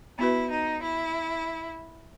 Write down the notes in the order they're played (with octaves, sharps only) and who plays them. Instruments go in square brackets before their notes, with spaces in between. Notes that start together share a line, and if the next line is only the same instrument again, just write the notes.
[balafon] B3 F#4 B4 [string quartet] E4
[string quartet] D#4
E4